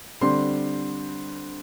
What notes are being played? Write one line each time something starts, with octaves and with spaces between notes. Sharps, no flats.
D3 G3 C4 C6